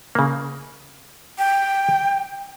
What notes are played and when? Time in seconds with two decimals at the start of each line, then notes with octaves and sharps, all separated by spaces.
0.15 C#3 A#3
1.38 G5